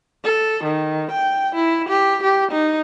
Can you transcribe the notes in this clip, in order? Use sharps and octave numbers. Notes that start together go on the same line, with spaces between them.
A4
D#3
G5
E4
G4
G4
D#4